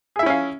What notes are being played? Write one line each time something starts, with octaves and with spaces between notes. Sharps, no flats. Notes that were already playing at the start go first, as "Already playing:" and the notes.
C#4 E4 G#4 E5 F5